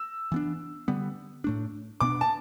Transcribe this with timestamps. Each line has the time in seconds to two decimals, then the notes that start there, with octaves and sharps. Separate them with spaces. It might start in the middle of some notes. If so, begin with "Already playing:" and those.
Already playing: E6
0.32 E3 B3 D4
0.88 D3 G3 B3
1.44 A2 A3 D4
2.00 B2 B3 D4 D6
2.21 A5